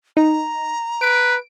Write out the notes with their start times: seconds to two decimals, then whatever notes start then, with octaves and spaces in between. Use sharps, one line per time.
0.17 D#4 A#5
1.01 B4 D7